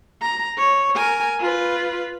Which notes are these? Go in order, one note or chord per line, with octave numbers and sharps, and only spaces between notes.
A#5
C#5
A#4 G#5
F4 B4